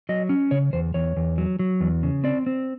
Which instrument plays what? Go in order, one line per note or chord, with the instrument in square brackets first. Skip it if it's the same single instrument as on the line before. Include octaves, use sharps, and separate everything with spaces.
[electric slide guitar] F#3 D#5
C#4
C#3 C#5
E2 C5
E2 C#5
E2
F#3
F#3
E2
C#3
C4 D5
C4